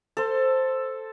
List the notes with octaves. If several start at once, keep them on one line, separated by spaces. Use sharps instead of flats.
A4 C5